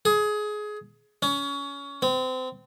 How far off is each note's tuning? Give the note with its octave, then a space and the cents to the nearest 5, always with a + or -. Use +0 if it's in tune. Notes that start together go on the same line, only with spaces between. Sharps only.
G#4 +20
C#4 +25
C4 -30